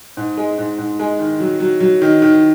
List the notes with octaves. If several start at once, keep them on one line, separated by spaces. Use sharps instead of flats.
G#2
G#3
G#2
G#2
G#3
D#3
F#3
F#3
F#3
D#3
D#3